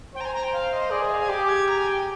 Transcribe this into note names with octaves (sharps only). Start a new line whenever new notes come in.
C5 G5
A#5
G#5
A#5
G5
F5
D#5
G#4 D5
D#5
F5
G#5
G4 D6
G#6
A#5
G#5
G5